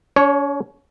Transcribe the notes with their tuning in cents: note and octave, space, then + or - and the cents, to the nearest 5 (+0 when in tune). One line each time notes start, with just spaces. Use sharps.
C#4 +45 C#5 +0